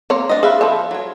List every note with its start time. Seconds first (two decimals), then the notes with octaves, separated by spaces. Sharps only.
0.10 A#3 C4 C#5 A#5
0.29 D4 D#5
0.43 G#4 B4 E5 F5
0.61 F3 A4 C5
0.91 F#3 C#5